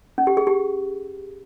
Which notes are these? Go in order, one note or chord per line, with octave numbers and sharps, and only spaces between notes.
C#4
G4
G#4
G4